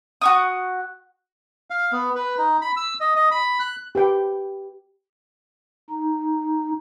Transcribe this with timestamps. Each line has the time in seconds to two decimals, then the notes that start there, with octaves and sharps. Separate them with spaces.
0.22 F#4 C#6 D#6
1.70 F5
1.92 B3
2.15 B4
2.38 D#4
2.62 B5
2.76 E6
3.00 D#5
3.16 D#5
3.31 B5
3.60 F#6
3.95 G4 B4 G5
5.90 D#4